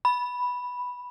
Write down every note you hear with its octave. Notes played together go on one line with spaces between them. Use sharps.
B5